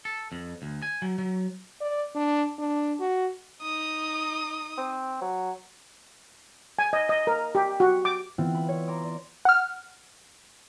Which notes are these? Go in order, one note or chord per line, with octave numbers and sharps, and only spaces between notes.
A4
F2
D2
G#5
F#3
F#3
D5
D4
D4
F#4
D#4 D#6
C4
F#3
G#5
D#5
D#5
A#4
G4
F#4
D6
E3 B3 C4 E4 F4
B5
C#5
A#5 C6 D6
D5 D6
F#5 F6